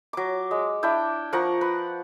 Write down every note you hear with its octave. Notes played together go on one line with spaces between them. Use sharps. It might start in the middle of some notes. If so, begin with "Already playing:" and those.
F#3 D6
G#3
D4 E4 G5
F3 A#4 F#5 C#6
B4